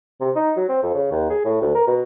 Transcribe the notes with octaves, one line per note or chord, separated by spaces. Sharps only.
C3
D#4
F#3
C4
F2
C#3
D#2
G#4
A2
D2
A#4
B2